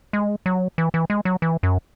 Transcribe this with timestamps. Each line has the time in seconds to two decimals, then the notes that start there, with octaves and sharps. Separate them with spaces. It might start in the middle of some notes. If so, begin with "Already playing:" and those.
0.13 G#3
0.46 F#3
0.78 E3
0.94 E3
1.10 G#3
1.25 F#3
1.42 E3
1.63 F#2